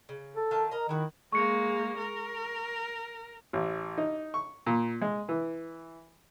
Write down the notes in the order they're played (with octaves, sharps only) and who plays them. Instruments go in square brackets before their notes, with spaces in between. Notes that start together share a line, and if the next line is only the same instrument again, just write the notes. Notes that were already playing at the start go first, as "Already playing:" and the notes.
[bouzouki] C#3
[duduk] A4
[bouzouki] D#3 F4 A5
[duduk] A#4 [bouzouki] D#5 A#5
[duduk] D#3 [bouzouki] E4 F#4
[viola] G#3 A#3 [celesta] C#6 C#7
[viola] A#4
[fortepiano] A1
D#4
C#6
A#2
G#3
E3